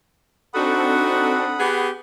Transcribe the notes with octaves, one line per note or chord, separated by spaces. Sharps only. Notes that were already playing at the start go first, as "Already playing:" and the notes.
C4 D4 D#4 F#4 A4 F#5 B5 D#6
B3 G4 G#4